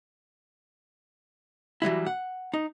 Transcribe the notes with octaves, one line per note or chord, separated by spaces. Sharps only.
E3 F#3 G3 E4
F#5
D#4